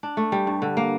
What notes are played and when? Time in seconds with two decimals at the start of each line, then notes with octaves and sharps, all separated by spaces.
0.03 D4
0.17 A3
0.32 G3
0.47 G2
0.62 D3
0.77 A#3